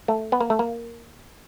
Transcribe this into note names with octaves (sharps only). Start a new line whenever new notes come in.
A3
B3
A#3
A3
A#3